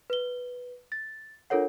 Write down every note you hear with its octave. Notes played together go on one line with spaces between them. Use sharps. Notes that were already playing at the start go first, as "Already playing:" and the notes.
B4 G7
A6
D4 F4 A4 A#4 C#5 F#5